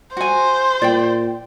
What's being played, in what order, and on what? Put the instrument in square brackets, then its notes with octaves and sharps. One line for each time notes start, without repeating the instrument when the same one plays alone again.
[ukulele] F#4 G#5 [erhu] C5
[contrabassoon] A#2 [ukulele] D5 G5